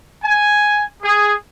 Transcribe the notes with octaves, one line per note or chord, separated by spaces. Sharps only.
G#5
G#4